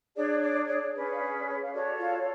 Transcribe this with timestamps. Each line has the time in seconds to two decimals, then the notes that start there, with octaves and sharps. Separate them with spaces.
0.16 D4 G#4 C#5 D5
0.42 D5
0.65 C#5
0.68 D5
0.94 C#4 G#4 B4
1.11 F5
1.21 D5
1.47 C#5
1.61 F5
1.72 F#4 A4 C#5 D5
1.98 F4 F5